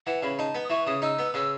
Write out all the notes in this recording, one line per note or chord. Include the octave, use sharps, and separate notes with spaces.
E3 F#5
C#3 B5
D#4 A5
B3
D#6
E3 C#6
C#3 D#6
D#4 E6
B3
C#3 E6